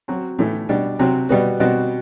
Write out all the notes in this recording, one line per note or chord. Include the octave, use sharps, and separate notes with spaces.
F#3 C4 F#4
A2 E3 A3 E4
B2 G3 D4
C3 F#3 C4 F#4
B2 G3 B3 F#4
B2 G3 C4 F#4